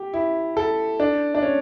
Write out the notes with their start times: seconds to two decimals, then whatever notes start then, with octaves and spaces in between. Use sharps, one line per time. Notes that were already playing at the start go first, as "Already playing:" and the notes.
Already playing: G4
0.13 E4
0.57 A4
1.00 D4
1.35 D4
1.42 C#4